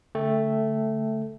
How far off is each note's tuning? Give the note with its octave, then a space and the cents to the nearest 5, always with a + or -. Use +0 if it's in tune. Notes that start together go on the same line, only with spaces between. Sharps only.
D3 -45 A3 +0 G5 +5